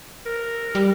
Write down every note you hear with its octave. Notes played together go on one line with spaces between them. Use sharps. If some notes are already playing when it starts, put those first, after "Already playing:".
A#4
G3